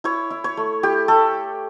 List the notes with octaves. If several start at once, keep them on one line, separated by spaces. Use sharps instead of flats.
E4 C#5
E4
C#5
A3
E4 G4
A3 A4